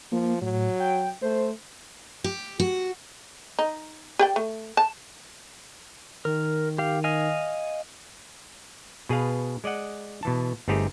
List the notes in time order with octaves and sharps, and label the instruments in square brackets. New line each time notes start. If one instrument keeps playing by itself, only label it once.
[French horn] F3 [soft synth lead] A#3
[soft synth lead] A2 [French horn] F#3
[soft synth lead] G5
[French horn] A3 [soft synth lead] C5
[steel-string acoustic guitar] G4
F#4
[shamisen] D#4
G4 D5 G5
A3
A5
[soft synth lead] D#3 [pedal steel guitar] A#4
[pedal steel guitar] G4 F5
D#5 F5 G#5
[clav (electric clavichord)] B2 G#4 B4 F5
G#3 D5 D#5 F#5
B2 E3 A5
G1 A3 C4 D#4 G4 G#4